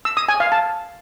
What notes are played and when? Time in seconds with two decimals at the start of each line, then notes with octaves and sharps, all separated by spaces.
0.05 E6
0.17 D#6
0.29 G#5
0.40 F5
0.52 A5